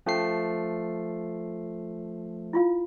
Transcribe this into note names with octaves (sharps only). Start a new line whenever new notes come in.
F3 A3 C#4 C7
E4 F4 F5